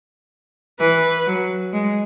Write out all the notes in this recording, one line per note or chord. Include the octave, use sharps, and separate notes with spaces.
E3 B4
F#3
G#3